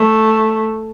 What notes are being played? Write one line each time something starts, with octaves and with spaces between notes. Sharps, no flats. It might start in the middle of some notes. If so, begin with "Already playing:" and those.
Already playing: A3